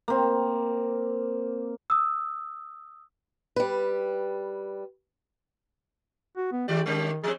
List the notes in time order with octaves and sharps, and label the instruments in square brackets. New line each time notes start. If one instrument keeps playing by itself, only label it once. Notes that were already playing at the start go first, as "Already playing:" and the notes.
[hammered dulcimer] A#3 C4
[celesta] D#6 E6
[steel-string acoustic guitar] G3 B4
[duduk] F#4
B3
[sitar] D#3 G#3 D5 [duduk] G4
[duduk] D#3 [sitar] G3 C#4 G4
[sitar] F3 G3 C4 [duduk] G#4